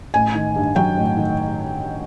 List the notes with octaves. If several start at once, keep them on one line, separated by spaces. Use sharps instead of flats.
A1 G#5
D#3
G2
F#3 G5
A1
D#3